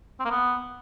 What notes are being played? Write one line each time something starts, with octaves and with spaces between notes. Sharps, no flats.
C4
A#3
B3